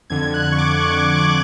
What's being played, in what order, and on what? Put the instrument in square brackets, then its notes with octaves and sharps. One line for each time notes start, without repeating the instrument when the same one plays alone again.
[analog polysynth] F2 D3 G#6
F#6
C#6
D6
C#6
D6
C#6
D6